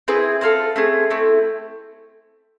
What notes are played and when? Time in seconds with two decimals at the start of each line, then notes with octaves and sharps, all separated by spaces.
0.08 C4 E4 G#4 B4
0.41 C4 F4 A4 C5
0.76 A3 C4 G#4
1.10 A3 C4 E4